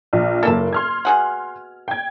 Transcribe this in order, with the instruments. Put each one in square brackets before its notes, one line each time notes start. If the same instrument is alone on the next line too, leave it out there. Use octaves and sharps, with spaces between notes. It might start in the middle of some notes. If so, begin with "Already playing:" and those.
[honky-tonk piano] A#1
[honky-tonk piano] F#1 A#3 [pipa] A4 E5 A5
[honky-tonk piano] C6 F6 G#6
[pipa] B2 G#4 F#5
[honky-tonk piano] G5 G#6